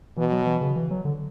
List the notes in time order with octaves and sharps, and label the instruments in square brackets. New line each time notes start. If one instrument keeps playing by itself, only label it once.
[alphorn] B2 [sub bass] E3
[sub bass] F#3
E3
C#3
E3
F#3
D3